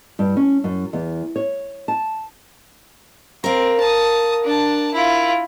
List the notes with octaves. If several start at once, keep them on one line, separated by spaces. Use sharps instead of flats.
G2
C#4
F#2
E2
C#5
A5
C4 A#4 F5
A5 D#6
D4 A5
E4 F4